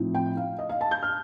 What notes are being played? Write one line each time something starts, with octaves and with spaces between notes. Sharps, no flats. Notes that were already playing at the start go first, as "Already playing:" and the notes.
Already playing: A2 F3 C4 D#4
G5
F5
D#5
F5
A5
G6
F6